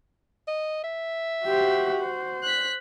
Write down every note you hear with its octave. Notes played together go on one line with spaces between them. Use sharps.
D#5
E5
F#4 G4 C5
C5
F#6 B6